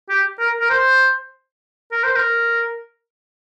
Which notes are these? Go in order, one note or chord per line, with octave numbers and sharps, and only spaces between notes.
G4
A#4
A#4
C5
A#4
C5
A#4